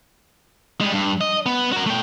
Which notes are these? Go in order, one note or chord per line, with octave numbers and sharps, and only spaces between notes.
G3 G#3
G2
D#5
B3
F#4 A#4
A3 G5